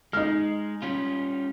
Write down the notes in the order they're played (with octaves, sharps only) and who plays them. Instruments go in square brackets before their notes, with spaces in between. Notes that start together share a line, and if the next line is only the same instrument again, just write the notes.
[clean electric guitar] G#3 [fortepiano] D#4 F6
[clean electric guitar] G3 C#4 F4